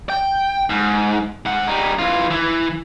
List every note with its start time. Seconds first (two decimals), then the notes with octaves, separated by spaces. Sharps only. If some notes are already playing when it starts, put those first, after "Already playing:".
0.10 G5
0.70 G#2
1.45 G#2 F#5
1.67 G3 D#4
1.99 E3 F4
2.30 E3